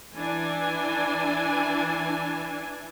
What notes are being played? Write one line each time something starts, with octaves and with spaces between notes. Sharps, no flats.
E3 D4 G#5